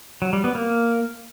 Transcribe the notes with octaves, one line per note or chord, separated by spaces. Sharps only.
F#3
G3
B3
A#3